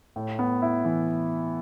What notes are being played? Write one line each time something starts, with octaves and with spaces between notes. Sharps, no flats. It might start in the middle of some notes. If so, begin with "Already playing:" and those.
A2
B3
E4
E3